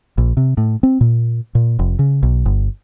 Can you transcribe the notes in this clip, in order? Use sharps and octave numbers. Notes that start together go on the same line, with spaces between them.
A#1
C3
A2
C4
A#2
A#2
F1
C#3
B1
G1